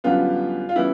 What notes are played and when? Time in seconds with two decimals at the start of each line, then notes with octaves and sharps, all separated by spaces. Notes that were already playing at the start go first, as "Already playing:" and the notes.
0.04 F#2 D3 G3 B3 F4
0.69 F4
0.76 C#3 E3 G3 B3 E4